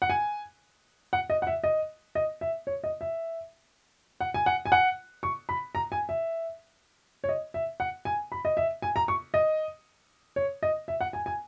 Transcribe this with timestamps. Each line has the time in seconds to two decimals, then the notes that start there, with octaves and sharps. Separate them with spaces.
0.02 F#5
0.10 G#5
1.13 F#5
1.30 D#5
1.42 F#5
1.47 E5
1.64 D#5
2.15 D#5
2.41 E5
2.67 C#5
2.84 D#5
3.01 E5
4.20 F#5
4.34 G#5
4.46 F#5
4.66 G#5
4.72 F#5
5.23 C#6
5.49 B5
5.75 A#5
5.92 G#5
6.09 E5
7.24 C#5
7.29 D#5
7.54 E5
7.80 F#5
8.05 G#5
8.32 B5
8.45 D#5
8.57 E5
8.82 G#5
8.96 A#5
9.08 C#6
9.34 D#5
10.36 C#5
10.63 D#5
10.88 E5
11.01 F#5
11.13 G#5
11.26 G#5